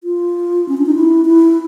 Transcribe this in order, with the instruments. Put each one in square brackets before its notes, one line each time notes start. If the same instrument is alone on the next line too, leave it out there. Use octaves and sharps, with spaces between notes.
[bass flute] F4
C#4
D4
D#4
E4
E4